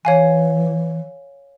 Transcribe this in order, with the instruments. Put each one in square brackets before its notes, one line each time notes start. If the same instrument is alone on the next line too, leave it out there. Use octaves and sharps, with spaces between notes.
[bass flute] E3 [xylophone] C#5 F5 G#5